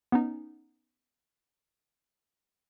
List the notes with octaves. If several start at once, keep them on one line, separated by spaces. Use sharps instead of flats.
B3 C#4 D#4